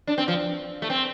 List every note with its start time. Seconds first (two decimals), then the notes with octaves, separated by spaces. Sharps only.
0.07 D4
0.18 C4
0.28 F3
0.82 A3
0.90 C4